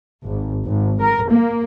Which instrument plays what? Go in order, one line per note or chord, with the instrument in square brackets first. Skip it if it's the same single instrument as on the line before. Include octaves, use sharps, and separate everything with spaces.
[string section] G#1
G#1
A#4
A#3